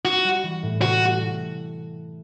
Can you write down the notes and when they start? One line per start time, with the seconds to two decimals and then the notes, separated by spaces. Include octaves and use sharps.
0.05 B3 F#4
0.24 G3
0.43 E3
0.63 A2
0.82 C3 F#4
1.01 A3